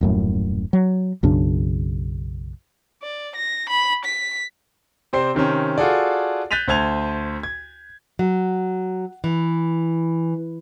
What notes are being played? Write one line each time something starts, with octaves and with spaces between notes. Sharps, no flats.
D#1 F#2 A2
F#3
B1 F#2 C#3 D4
D5
A#6
B5
B6
C3 C4 C5 D5 C7
C3 D#3 C4 C#4
F4 F#4 G#4 A4 D5
F#6 G6 A6 B6 D#7 F7
D2 C5 A5 G#6 F7
G#6
F#3
E3